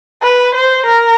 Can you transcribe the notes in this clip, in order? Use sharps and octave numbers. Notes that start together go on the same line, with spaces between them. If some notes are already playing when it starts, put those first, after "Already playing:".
B4
C5
A#4